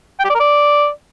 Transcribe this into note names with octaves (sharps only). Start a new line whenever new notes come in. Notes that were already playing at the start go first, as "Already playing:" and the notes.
G5
G4
D5
A#4
D5